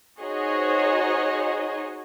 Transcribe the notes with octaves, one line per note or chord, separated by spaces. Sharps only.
D#4 F#4 G#4 C5 C#5 D#5